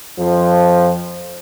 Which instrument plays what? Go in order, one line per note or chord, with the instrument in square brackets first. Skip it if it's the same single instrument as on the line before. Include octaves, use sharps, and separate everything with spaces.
[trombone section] F2 F3